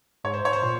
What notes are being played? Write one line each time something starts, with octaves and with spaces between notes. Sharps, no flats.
G#2 C#5
C5
C#5
C5
A#2